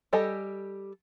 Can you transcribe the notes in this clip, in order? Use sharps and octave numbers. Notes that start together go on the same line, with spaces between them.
G3 G4 A4 D#5 G#5